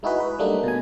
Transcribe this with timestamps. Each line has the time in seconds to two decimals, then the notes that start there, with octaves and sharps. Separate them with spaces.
0.03 G#3 D#4 E4 F#4 G#4 B4
0.20 B4
0.39 F#3 G3 A3 A#3 D4 D#4
0.64 B2 G#5